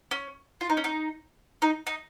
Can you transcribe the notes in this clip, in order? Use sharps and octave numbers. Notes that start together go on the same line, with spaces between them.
C#4
F4
D#4
C#4
D#4
D#4
D#4